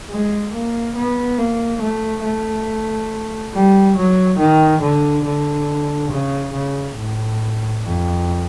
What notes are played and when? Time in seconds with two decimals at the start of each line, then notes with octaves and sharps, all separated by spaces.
0.09 G#3
0.53 A#3
0.96 B3
1.38 A#3
1.81 A3
2.24 A3
3.53 G3
3.96 F#3
4.39 D#3
4.82 D3
5.25 D3
6.11 C#3
6.53 C#3
6.96 A2
7.83 F2